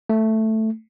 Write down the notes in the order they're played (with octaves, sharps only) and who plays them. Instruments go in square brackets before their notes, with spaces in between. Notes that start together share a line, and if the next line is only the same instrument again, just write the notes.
[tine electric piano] A3